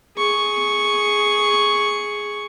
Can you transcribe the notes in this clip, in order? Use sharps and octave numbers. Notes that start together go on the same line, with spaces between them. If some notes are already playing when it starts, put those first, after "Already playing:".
G#4 C#6